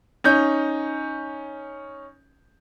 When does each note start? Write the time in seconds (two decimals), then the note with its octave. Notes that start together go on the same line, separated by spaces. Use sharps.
0.24 C#4 D#4 G6